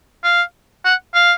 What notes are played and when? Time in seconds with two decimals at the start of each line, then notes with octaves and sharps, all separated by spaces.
0.24 F5
0.85 F#5
1.15 F5